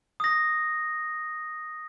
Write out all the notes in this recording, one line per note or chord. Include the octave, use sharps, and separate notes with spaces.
D#6 A#6